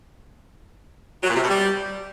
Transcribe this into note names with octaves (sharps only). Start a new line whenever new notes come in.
F#3
A#2
C3
B2
G3